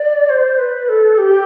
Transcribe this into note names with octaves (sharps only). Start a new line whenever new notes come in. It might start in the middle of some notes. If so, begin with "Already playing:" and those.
Already playing: D5
C5
B4
A4
G4